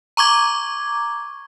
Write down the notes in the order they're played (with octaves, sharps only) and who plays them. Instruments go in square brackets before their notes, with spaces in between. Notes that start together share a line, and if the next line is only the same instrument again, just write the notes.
[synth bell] A#5 C#6 D6 G#6